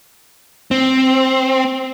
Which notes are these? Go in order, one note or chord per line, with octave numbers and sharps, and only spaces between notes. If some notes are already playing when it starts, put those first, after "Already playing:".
C4